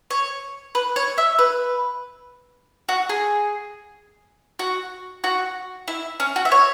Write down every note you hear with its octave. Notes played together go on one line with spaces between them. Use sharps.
C#5
B4
C#5
E5
B4
F#4
G#4
F#4
F#4
E4
C#4
F#4
E5
C#5